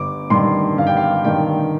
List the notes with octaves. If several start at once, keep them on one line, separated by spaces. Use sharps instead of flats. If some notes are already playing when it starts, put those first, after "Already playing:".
Already playing: G1 D6
G2 D#3 C6
G1 F5
G5
F5
G2 D#3 G5